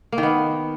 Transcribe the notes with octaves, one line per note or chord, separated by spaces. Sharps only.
A#3
D#3
B3